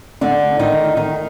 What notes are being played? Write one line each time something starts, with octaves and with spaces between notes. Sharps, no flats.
D3 D4
D#3 D#4
D#3 D#4